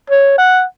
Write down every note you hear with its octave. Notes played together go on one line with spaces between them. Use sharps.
C#5
F#5